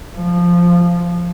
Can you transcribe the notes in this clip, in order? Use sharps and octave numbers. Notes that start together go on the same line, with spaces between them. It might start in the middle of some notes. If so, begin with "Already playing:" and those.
F3